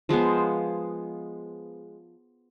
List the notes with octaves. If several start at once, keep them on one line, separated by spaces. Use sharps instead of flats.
F3 G#3 B3 C5